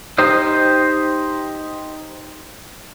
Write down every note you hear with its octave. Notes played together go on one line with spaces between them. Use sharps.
D#4 G4 C5 D#5